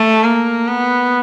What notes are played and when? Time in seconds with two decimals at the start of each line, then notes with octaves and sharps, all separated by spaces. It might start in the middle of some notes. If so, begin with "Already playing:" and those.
Already playing: A3
0.23 A#3
0.68 B3